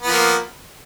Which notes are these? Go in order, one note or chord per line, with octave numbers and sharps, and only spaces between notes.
F3 A#3 B3